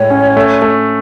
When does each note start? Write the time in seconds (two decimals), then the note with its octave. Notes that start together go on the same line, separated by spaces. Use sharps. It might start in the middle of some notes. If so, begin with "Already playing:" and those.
Already playing: A2 G#3 C#5
0.10 C#4
0.36 A3
0.62 A3